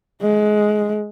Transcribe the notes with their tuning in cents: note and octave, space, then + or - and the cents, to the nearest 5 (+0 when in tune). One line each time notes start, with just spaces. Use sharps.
G#3 +20